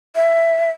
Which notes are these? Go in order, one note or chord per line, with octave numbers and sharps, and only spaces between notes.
E5